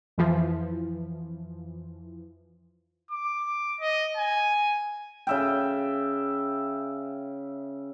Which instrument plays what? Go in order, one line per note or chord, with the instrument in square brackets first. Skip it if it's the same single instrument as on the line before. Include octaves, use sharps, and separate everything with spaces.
[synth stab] F2 E3 F3
[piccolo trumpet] D6
D#5
G#5
[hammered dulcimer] C#3 E5 G5